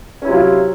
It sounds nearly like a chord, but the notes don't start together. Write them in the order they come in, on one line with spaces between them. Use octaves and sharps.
C#4 E4 C3 F#3 F4